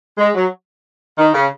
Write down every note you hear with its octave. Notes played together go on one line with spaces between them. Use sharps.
G#3
F#3
D#3
C#3